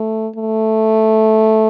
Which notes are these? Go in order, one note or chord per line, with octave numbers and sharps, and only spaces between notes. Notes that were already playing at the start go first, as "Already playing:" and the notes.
Already playing: A3
A3